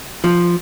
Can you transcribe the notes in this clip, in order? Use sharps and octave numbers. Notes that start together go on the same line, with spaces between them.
F3